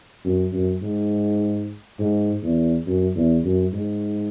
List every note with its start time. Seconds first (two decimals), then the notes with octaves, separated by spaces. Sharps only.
0.24 F#2
0.52 F#2
0.82 G#2
1.99 G#2
2.42 E2
2.86 F#2
3.15 E2
3.44 F#2
3.73 G#2